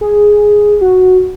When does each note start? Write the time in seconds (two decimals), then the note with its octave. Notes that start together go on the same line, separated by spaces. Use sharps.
0.01 G#4
0.81 F#4